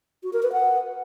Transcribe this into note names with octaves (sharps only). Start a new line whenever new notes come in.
F#4
A#4
B4
F#5